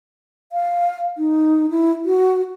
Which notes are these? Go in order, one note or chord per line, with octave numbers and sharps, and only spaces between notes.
F5
D#4
E4
F#4